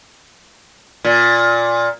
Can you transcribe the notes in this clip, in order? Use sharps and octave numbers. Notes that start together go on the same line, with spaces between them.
A#2